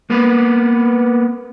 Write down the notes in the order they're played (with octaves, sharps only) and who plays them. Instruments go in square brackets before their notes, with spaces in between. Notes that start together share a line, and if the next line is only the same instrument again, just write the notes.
[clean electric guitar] A#3 B3 B4